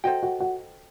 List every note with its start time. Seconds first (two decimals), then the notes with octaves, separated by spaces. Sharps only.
0.04 F#4 A4 C5 D#5 G5
0.23 F#4
0.40 F#4